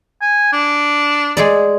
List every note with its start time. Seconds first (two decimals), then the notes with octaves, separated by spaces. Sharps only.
0.21 G#5
0.53 D4
1.37 G#3 G#4 D5